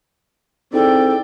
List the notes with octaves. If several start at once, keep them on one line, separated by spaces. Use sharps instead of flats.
C4 D#4 E4 G#4 A4 D5 G5